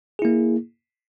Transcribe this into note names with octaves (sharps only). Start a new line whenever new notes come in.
A#3 E4 G#4